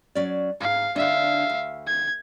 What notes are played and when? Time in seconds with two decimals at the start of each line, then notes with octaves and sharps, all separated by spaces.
0.15 F#3 C#4 D5
0.61 G#2 F5
0.96 D3 D4 E5 F5
1.50 D2
1.87 G#6